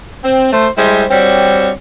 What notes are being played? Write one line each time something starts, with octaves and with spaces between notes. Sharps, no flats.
C4
A3 C5
G3 G#3 E4 C5
G3 C4 D4 F#4 C#5